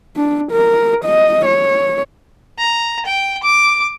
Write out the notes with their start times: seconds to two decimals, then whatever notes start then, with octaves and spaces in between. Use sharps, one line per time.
0.17 D4
0.52 A#4
1.05 D#5
1.46 C#5
2.58 A#5
3.06 G5
3.43 D6